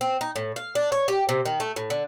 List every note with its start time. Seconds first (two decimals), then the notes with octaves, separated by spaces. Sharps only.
0.01 C4
0.21 D#4
0.36 A2
0.56 F5
0.75 D4
0.92 C#5
1.08 G4
1.29 C3
1.45 D#3
1.60 A3
1.76 A2
1.90 D3